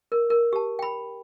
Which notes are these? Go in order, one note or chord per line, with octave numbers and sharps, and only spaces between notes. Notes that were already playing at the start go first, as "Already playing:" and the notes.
A#4
A#4
G4 A5
G5 B5